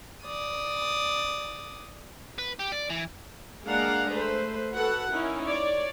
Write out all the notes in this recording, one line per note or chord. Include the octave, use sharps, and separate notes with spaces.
D5 D#6
B4
G4
D5
E3
G#3 A#3 D4 F5 F#5 A#5
A3 B4 C5
F#4 A4 B4 F#5
C#4 D#4 E4 A#4
C#5 D5